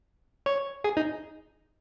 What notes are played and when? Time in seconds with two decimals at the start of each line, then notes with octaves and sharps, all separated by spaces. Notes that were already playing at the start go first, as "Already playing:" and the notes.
0.46 C#5
0.84 G#4
0.97 D#4